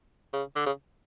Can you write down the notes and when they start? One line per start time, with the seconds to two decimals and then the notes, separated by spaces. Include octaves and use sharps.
0.33 C#3
0.56 D3
0.66 C#3